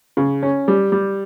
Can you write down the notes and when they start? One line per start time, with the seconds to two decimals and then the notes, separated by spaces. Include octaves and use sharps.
0.17 C#3
0.43 C#4
0.68 G3
0.92 G3